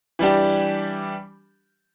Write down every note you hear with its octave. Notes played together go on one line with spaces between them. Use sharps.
E3 G3 D4 G4